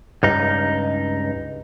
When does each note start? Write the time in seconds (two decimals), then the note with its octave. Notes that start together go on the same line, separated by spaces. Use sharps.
0.23 C#2 G2 D#4